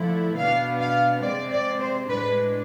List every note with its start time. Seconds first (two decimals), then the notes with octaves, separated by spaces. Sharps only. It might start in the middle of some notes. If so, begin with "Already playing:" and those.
Already playing: D3 F3 A3 E4
0.36 B2 B3 D4 F5
0.80 F5
1.22 C3 G#3 C4 D5
1.52 D5
1.80 C5
2.09 A2 G#3 D4 B4